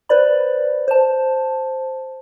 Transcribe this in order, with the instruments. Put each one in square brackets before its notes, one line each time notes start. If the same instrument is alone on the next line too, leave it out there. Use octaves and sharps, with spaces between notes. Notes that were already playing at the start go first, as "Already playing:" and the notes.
[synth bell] B4 C5 D5 B5
C5 A5